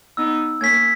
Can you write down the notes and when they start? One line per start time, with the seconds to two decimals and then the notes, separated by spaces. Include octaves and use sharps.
0.17 B3 D#4 E6
0.60 A#3 C#4 G#6 B6